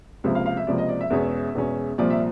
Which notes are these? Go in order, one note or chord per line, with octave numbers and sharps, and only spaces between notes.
C#2 C3 F3 A#3 E5
F5
F5
E5
C#2 C3 F3 A#3 D5
D#5
D5
E5
E2 B2 G#3 C#4
E2 B2 G#3 C#4
C2 A#2 F3 A#3 D5
E5